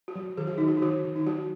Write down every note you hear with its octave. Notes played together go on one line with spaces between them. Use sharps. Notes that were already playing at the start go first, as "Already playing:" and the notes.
F#4
F#3
D#3 G#4
F#4
D#3 D#4
F#4
D#4
D#3 F#4
D#3
D#4
F#3 F#4